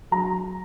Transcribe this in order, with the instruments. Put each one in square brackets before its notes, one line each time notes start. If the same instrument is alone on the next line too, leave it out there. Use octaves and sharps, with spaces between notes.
[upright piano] F#3 A#5